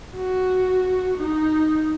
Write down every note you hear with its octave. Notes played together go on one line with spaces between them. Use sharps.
F#4
D#4